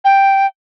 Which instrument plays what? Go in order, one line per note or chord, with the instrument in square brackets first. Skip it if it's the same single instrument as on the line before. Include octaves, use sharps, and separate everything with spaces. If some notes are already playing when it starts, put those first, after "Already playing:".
[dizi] G5